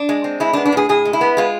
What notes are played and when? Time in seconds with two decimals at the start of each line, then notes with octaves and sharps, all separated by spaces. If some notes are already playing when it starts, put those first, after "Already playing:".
Already playing: D4
0.09 G#3
0.24 C4
0.40 G#3 E4
0.53 D4
0.57 B3
0.66 D4
0.72 A2 G#4
0.89 A2 G#4
1.05 G#3
1.13 E4
1.21 B3
1.37 G#3 F4